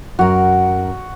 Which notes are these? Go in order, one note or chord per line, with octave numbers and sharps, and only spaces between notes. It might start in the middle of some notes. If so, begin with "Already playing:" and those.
F#2 F#4 A#4